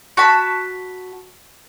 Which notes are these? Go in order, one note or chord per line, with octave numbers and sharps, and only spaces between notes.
F#4 A5 B5